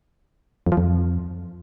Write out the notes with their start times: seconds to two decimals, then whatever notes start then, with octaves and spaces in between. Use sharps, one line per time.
0.67 F2
0.72 F3
0.77 F2